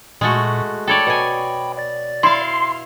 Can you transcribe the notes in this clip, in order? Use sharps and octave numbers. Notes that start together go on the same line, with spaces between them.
A#2 G#3 A3 F#4
A4 C#5 D5 G5 B5
B2 G#5
D5 A6
E4 F5 C6